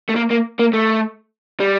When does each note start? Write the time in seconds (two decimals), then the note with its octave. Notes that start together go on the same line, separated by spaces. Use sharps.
0.10 A3
0.16 A#3
0.31 A#3
0.59 A#3
0.73 A3
1.60 G3